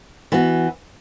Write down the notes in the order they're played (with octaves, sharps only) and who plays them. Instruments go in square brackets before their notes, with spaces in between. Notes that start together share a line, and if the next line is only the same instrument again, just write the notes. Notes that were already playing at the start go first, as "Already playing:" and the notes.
[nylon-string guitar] E3 B3 F#4